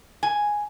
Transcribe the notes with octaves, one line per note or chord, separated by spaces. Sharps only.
G#5